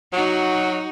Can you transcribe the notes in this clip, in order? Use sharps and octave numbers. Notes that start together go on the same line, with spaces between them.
F#3 D#4 F#4